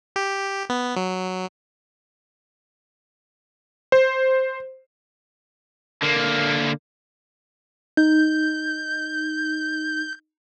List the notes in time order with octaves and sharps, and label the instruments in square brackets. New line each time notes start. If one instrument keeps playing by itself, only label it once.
[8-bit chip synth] G4
B3
F#3
[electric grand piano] C5
[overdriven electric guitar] D3 A#3
[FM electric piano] D#4 [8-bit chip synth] G6